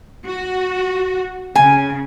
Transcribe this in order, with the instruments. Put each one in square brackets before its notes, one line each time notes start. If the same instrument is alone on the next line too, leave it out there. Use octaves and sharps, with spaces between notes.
[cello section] F#4
[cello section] C#3 [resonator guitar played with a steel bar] G#5